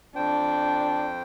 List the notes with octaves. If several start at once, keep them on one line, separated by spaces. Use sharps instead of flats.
F2 D4 C5 G5